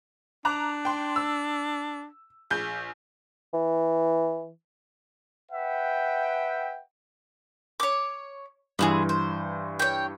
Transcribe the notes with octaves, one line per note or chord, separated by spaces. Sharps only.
D4 A#5 D6 F#6
G5 C6
E6
A#1 G#4 G6
E3
B4 E5 F#5 G5
C#5 D6
G2 E3 B3 C4 G#4
C5
C#5 G5